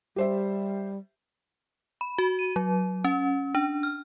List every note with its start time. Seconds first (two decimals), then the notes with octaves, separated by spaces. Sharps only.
0.16 G3 G4 C5 E5
2.01 B5
2.18 F#4
2.39 D#7
2.56 F#3
3.04 C#4
3.55 D4
3.83 F6